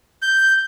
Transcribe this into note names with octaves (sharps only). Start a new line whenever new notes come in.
G6